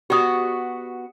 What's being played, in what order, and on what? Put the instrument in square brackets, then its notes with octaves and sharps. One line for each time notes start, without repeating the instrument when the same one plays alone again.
[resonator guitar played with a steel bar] B3 F#4 [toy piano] G4 D5 D#6